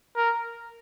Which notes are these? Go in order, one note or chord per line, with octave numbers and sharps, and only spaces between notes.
A#4